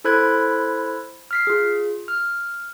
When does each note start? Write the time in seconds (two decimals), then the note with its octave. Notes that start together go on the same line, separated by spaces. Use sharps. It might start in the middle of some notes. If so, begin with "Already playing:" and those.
0.04 E4 A4 C5 B5 F#6 G#6
1.31 F6 B6 C7
1.47 F4 G#4
2.08 F6